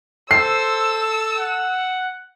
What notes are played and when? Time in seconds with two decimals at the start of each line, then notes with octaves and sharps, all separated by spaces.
0.31 A4 C5 E6 C7
1.37 F#5